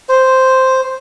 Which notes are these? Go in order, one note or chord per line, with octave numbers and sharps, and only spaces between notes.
C5